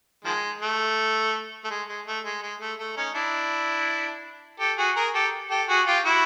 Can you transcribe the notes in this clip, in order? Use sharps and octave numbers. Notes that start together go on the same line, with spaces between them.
D#3 F3 G#3
A3
A3
G#3
G#3
A3
G#3
G#3
A3
A3
C#4 D#4
D4 E4
G4 A4
F#4 G#4
G#4 A#4
G4 A4
G4 A4
F#4 G#4
F4 G4
E4 F#4